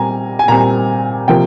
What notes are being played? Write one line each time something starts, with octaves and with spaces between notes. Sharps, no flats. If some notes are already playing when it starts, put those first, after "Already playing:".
Already playing: A#2 G3 C4 G#5 A#5
G#5
A#2 G3 C4 A#5
C3 F3 A#3 G5